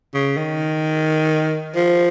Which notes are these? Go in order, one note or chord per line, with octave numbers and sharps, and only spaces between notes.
C#3
D#3
F3